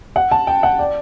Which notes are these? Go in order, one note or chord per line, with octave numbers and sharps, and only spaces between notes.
F#5
A5
G5
F#5
D5